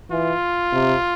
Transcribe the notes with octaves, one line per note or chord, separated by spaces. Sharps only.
E3 F4
C3